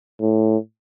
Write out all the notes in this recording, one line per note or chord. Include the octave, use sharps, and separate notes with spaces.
A2